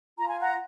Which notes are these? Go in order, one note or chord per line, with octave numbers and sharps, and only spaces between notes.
F4 A#5
G#5
F#5 A#5